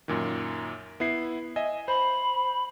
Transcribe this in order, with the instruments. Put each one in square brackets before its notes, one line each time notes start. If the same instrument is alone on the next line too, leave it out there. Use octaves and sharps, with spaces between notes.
[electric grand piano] F#2 A#2 D#3
B3 E4 C7
D#5 E5 G#5
[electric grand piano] C5 [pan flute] B5